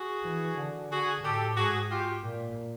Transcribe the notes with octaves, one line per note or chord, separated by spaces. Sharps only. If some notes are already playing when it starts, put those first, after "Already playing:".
Already playing: F#4 G#4
E3
D3
F#4 G#4
A2 G4 A4
G#2 F#4 G#4
F4 G4
A#2